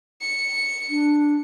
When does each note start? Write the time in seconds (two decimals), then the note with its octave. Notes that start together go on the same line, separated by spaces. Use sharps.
0.21 C#7
0.90 D4